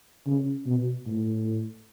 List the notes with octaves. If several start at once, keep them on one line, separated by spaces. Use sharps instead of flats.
C#3
B2
A2